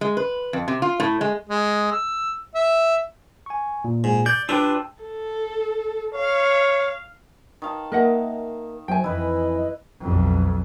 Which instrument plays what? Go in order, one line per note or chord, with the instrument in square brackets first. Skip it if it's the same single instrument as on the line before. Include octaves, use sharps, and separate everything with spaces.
[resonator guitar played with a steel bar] G#3
B4
F2
C3
F4
A2
G#3
[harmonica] G#3
E6
E5
[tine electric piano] G#5 C#6
A#2
[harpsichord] G#2
[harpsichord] D5 [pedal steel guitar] G6
[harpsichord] D4 [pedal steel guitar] F4 G4 B4 [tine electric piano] G5 A5 E6
[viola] A4
[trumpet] C#5 [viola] F5
[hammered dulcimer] D#3 F5 A5
[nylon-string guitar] A#3 E5 [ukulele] A#4 D#5 F#5
[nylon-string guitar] F#3 C5 E5 [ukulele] G5 G#5
[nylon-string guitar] F2 E3 [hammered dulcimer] E4 B4 [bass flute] D#5
[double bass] B1 F2